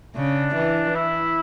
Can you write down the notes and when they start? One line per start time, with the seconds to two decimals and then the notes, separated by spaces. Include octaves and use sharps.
0.15 C#3 D4
0.55 E3
0.95 E4